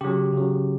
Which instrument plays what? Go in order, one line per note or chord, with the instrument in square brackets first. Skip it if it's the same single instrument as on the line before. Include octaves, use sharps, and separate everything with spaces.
[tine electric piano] C#3 F#3 G4
C#3 F#3